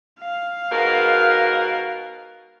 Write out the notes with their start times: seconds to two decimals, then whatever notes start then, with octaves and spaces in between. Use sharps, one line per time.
0.19 F5
0.71 G#2 B2 A#4